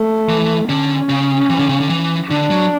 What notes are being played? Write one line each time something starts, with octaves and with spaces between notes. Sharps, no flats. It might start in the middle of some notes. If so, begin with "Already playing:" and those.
Already playing: A3
E3
D3 C#4
C#3
E3
D3
C#3
D3
E3
D3 D4
F#3